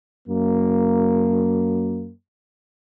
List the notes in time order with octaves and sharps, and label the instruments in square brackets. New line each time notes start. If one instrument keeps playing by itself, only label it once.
[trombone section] F#2 A#3